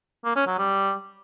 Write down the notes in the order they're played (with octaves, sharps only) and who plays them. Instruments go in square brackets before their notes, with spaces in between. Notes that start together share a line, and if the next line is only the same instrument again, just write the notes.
[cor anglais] A#3
C#4
F#3
G3